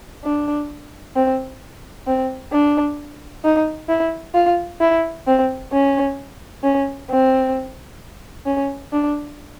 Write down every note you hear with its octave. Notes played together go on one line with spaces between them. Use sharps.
D4
C4
C4
D4
D#4
E4
F4
E4
C4
C#4
C#4
C4
C#4
D4